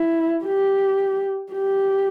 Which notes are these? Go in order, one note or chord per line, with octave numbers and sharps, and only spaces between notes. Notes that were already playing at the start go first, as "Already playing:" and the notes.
Already playing: E4
G4
G4